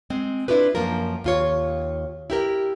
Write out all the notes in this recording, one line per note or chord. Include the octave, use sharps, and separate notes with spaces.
G#3 C4
D4 E4 F4 G4 B4
F#2 F3 A#3 F4 A#4
D#2 F4 C#5
E4 G4 A#4